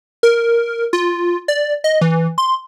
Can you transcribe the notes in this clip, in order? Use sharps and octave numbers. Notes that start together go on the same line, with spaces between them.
A#4
F4
D5
D#5
E3
C6